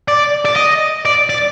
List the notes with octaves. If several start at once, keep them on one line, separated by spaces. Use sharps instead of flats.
D5
D5
D#5
D5
D5